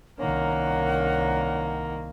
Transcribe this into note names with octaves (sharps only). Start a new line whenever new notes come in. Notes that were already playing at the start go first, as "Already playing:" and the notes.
C2 D#3 A#3 C#4 A#4 F#5